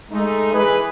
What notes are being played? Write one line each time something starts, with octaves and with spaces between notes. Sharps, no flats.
G#3 A3 D#4
E3 G#4 B4